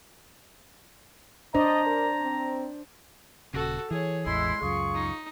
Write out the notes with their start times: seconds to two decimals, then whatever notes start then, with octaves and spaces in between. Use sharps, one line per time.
1.54 D4 C5 D5 D#5 A#5
1.87 A#4
2.21 C4
3.53 D#1 C#3 F#4 A4
3.91 E3 G#4 C#5
4.26 A1 E2 G#3 E4 C6
4.62 C#2 F#2 F4 G#4 C#6
4.94 D#4